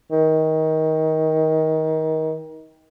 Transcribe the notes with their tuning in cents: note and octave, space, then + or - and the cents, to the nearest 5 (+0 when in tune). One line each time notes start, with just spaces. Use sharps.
D#3 +25